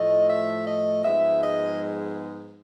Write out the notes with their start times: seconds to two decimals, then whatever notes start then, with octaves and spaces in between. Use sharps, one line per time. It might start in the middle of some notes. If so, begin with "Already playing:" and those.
Already playing: A2 F3 A3 D#5
0.29 E5
0.66 D#5
1.04 G#2 F3 G#3 B3 E5
1.43 D#5